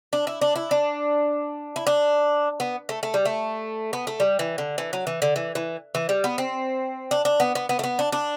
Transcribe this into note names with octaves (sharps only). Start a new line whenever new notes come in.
D4
E4
D4
E4
D4
E4
D4
B3
A3
A3
G3
A3
B3
A3
G3
E3
D3
E3
F#3
E3
D3
E3
E3
E3
G3
B3
C4
D4
D4
B3
B3
B3
A3
B3
D4
D4